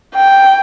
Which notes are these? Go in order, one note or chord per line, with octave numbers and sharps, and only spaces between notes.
G5